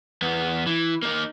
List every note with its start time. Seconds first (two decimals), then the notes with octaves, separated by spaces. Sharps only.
0.22 E2 B3
0.67 E3
1.03 A#3 D#4